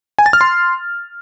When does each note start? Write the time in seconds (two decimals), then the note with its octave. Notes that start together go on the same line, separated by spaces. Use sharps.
0.19 G#5
0.26 A6
0.33 F6
0.41 C6